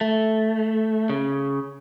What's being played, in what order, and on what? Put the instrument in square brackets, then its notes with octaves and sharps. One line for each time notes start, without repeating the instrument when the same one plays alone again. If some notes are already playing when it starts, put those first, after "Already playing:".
[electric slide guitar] A3
C#3